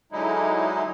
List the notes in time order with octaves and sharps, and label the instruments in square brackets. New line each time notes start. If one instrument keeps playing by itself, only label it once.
[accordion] D3 F#3 G#3 D#4 E4